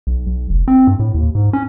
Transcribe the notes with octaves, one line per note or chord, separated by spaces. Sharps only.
B1
B1
F1
C4
G2
A2
D#2
G#2
C#4